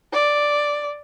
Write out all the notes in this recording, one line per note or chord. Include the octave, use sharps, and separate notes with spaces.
D5